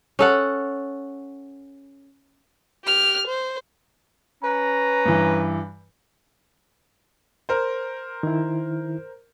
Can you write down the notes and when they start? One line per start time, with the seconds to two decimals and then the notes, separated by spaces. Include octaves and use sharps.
0.19 C#4 A4 F#5
2.84 G4 F6
3.27 C5
4.43 C#4 B4 A#5
5.05 G2 E3
7.49 A#4 C5
8.23 D#3 E4